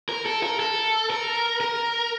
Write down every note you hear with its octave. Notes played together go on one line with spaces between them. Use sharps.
A#4
A4
A#4
A4
A#4
A#4